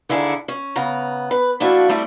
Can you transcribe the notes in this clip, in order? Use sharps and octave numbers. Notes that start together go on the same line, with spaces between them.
D#2 D3 E4 G#4 A4
C#4
C#3 B3 A#5
B4
F3 A3 A#3 D4 E4 F#4
G3 A3 C4 E4